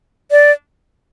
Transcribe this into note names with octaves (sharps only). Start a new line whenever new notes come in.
D5